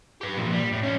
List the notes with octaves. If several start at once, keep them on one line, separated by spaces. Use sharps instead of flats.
G4 B4
A#2 F3
G3
A2
F3 C#4